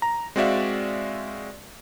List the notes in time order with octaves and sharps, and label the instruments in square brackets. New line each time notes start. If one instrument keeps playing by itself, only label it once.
[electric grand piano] A#5
G#3 C4 F#4 D5 E5 F5